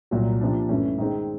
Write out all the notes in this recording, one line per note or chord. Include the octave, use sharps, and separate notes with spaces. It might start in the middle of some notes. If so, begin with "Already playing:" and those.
C2 A#2 F#3
C3 F3 A#3 D4
G2 E3 A3 C#4
D#3 G#3 C4